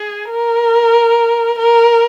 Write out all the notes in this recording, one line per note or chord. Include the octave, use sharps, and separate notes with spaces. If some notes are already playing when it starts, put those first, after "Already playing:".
Already playing: G#4
A#4
A#4